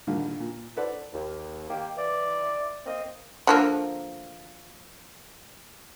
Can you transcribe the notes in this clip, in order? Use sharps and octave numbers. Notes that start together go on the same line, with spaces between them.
A#1 D3 D#3 G3 F5
A#2
A4 B4 C5 D5 F#5
D#2
D#3 A#3 G4
E3 D5
A#3 C4 D#5
D3 F3 A#3